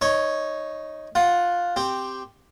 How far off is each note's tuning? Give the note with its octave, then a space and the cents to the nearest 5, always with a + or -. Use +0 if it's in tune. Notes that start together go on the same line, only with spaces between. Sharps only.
D#4 +0 C#5 +0 C#6 -35
F4 +10 F#5 +5
C4 +0 G4 +0